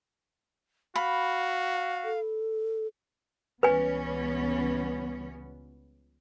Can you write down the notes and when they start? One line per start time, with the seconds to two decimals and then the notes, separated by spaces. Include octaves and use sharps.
0.96 F#4 F5 B5
2.04 A4
3.63 C#2 E3 G3 B3 C#4 B4 G#5